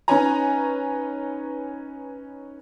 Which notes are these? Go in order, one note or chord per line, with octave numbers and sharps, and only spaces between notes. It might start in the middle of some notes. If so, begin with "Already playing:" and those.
C#4 D#4 B4 C#5 G#5 A#5